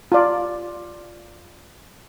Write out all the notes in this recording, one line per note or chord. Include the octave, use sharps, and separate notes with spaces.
F4 D5